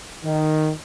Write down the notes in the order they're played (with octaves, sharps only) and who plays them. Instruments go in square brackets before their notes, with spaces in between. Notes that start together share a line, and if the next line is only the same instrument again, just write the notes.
[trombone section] D#3